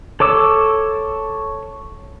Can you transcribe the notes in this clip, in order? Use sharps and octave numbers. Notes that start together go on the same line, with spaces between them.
A4 C#5 D6 E6